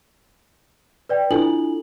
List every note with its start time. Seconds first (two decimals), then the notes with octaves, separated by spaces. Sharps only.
1.09 B4 D5 G5
1.31 D4 E4 F4 A4 G#5 F#7